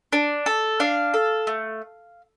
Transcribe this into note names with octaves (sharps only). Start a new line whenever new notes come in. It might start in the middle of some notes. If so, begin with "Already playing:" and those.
D4
A4
D4 F5
A4
A3